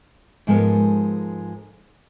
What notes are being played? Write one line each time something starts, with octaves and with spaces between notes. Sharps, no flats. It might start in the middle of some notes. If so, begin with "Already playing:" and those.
G#2 F3 G#3 B3 A4 A#4